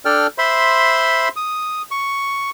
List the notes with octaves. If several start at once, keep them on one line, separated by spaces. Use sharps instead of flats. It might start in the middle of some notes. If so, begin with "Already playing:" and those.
D4 A4 D5 G5 F6
C5 E5 B5 C6
D#6
C#6